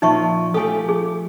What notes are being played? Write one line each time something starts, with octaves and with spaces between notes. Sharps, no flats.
A#2 F3 D#4 E5 C#6
F3 A3 G4 A4 G#5
G#4